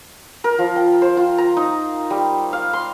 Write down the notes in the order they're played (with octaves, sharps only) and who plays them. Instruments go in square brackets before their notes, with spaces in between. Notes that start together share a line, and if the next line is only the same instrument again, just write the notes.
[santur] A#4
F3
G5
C5
F4
A#5
D#4
G3
F5
C6